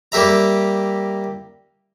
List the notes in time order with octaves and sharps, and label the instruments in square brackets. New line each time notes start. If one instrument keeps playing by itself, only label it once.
[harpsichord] G3 A#3 G4 E5 A#5